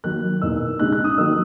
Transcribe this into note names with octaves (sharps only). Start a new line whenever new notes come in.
D#3 F#3 A#3 F#6
E2 B2 A#3 D#4 E6
C#3 G#3 D#4 F#6
F#6
D#6
D#3 F#3 A#3 D#4 E6